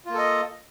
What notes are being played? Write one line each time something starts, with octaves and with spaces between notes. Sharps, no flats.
A#3 F4 A4 D#5